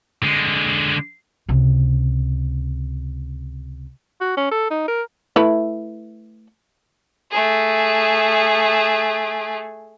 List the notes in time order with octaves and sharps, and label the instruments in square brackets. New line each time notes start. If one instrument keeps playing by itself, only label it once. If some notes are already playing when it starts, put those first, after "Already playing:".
[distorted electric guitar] D3 G#3
[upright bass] C#2 C3
[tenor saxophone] F#4
C#4
A4
D#4
A#4
[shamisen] A3 E4 B4
[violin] A3 G#4